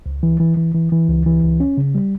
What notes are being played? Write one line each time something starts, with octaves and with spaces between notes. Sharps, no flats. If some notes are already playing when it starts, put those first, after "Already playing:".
C#2
E3
E3
E3
E3
E3
C#2
E3
C#2
C#4
C#3
G3